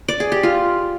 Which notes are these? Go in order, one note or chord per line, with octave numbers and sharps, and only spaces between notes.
D5
G#4
G4
F4